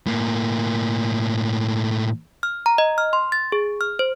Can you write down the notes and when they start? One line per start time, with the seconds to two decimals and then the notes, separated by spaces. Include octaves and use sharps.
0.06 A2 A#3
2.43 F6
2.66 A#5
2.78 D#5
2.98 F6
3.13 C6
3.32 A6
3.52 G#4
3.81 F6
3.99 C5